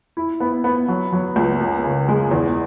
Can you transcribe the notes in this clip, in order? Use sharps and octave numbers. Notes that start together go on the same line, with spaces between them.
E4
B3
B3
F#3
F#3
C#2
F#2
C#3
G#3
E2